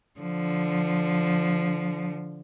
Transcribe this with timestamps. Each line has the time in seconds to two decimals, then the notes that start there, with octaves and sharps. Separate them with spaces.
0.20 D3 F3